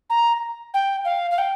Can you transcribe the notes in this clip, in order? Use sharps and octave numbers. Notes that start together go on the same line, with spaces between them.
A#5
G5
F5
F5
G5